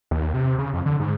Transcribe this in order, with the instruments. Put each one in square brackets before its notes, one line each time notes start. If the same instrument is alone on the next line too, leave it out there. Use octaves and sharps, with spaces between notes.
[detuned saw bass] D#2
C3
C#3
F2
D3
G#2